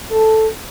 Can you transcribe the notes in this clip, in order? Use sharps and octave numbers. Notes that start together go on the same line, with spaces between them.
A4